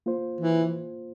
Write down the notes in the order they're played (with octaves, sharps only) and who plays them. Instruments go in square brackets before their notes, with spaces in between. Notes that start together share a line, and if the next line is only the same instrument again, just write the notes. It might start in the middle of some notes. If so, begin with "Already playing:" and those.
[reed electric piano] A#3 F4 C5
[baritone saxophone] E3